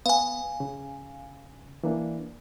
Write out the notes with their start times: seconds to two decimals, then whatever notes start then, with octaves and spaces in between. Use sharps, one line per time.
0.06 B3 F5 G#5
0.60 C#3
1.84 E3 A#3 D4